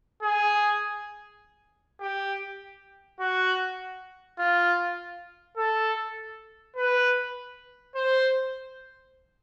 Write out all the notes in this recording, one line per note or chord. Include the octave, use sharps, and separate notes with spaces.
G#4
G4
F#4
F4
A4
B4
C5